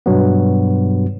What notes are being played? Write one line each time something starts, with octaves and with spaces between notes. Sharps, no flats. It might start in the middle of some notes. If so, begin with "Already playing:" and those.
G2 B2 F#3 B3